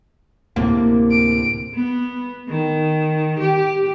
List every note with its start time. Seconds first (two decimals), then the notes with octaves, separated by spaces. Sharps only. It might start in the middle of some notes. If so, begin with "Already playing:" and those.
0.56 D2 A2 C3 A#3
1.11 D7
1.75 B3
2.49 D#3
3.40 G4